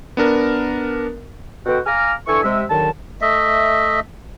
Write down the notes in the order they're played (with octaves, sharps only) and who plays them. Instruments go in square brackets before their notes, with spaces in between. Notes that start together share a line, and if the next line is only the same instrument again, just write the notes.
[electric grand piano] B3 D4 A#4
[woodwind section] B2 D3 F#4 G5
F5 G#5 A#5 D6 F6
D3 E3 A4 G#5 C#6
C3 G#3 E5
D#2 D3 D#3 F#3 A5
[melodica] A3 D#5 E5